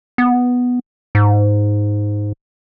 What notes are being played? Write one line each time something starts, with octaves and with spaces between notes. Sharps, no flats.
B3
G#2